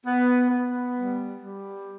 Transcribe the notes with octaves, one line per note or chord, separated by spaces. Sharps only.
B3
B3
G3
G3